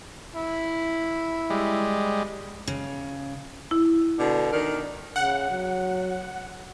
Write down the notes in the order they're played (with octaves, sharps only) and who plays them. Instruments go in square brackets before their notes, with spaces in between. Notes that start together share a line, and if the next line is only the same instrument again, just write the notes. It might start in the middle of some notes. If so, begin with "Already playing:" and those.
[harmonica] E4
[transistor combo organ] G3 G#3
[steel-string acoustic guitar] C#3
[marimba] E4
[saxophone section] B2 D3 D4
D#3 D4 A#4
[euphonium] C#3 [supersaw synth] F#5
[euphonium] F#3